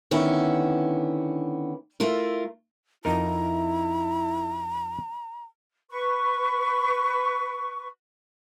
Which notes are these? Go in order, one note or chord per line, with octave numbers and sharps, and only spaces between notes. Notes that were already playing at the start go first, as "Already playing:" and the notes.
D3 D#3 B3 C#4 E4
A3 E4 F4 A#4
F2 D#4 E4 A#4 A#5
B4 C#6